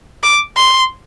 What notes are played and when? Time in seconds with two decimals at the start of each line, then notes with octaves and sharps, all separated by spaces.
0.23 D6
0.57 C6